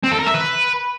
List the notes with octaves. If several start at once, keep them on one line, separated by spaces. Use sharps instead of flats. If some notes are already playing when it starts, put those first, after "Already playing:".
C4
A4
A#4
E5
B4